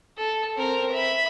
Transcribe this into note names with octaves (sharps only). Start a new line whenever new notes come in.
A4
C4 A#4
E5 B5